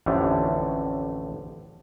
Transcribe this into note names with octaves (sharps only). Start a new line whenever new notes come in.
A1 F2 A2 D3 A3